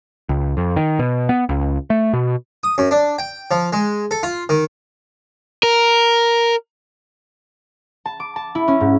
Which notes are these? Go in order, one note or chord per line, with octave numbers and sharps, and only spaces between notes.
C#2
F2
D#3
B2
B3
C#2
A3
B2
D#6
F#2
D4
G5
F3
G#3
A4
F4
D#3
A#4
A5
D6
A5
E4
C#4
G#2